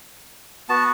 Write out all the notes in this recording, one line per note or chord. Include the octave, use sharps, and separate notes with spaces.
B3 F#4 A5